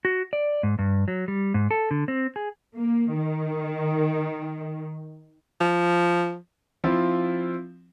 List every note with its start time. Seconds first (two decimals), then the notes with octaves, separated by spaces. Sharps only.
0.05 F#4
0.33 D5
0.63 G#2
0.79 G2
1.08 F#3
1.28 G3
1.54 G#2
1.71 A4
1.91 D3
2.08 C4
2.36 G#4
2.76 A#3
3.15 D#3
5.61 F3
6.84 F3 C4 E4 F4